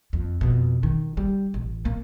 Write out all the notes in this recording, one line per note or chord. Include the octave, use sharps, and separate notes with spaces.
F2
F2 B2
D#3
G3
A1
A#3